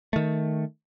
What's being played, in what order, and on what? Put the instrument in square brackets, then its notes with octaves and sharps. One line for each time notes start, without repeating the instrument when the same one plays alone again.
[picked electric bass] D#3 A3